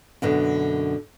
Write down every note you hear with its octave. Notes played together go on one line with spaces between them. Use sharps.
F#2 B2 D3